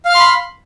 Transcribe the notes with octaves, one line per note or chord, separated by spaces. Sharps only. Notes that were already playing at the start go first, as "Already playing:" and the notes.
F5 B5 C6 F6